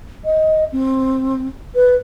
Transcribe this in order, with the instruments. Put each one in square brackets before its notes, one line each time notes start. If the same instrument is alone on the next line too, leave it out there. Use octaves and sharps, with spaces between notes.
[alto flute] D#5
C4
B4